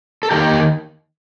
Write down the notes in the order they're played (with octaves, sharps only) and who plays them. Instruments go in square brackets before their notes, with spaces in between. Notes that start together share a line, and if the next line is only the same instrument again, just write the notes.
[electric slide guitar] A4
D#3 A#3 D#4 G4 A#4